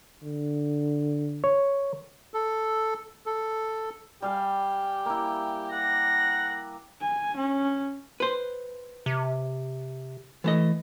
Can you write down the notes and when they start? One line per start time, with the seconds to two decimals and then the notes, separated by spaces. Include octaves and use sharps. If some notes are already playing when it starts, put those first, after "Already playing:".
0.23 D3
1.44 C#5
2.34 A4
3.26 A4
4.22 G3 G4 F5 G#5
5.06 A#3 E4
5.72 F#5 A#6
7.01 G#5
7.37 C#4
8.20 B4 C5
9.06 C3
10.44 E3 A3 D#5